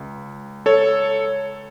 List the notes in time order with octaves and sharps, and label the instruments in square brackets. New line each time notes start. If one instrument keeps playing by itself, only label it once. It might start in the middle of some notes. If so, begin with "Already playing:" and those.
Already playing: [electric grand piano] C#2
A4 C#5